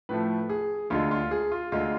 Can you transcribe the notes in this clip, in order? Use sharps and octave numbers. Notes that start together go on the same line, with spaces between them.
A2 F3 A3 B4
G#4
D2 D3 G#3 F4
F4
G#4
F4
D2 D3 G#3 F4